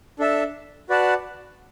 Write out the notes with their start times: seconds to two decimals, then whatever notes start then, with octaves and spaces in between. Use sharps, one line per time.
0.19 D4 A4 E5 A5
0.89 F#4 B4 D5 F#5 A5